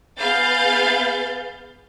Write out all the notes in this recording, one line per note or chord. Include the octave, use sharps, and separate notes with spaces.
B3 G#4 F5 G6 A6